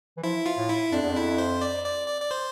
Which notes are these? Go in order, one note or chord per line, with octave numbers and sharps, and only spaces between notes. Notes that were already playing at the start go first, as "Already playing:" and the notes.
E3
F3 E4
F4
A2
E4
F2 D4
E2
F2 E4
C5
D5
D5
D5
D5
C5